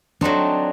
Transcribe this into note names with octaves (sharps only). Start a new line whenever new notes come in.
F#3 A3 C4 D4 D#4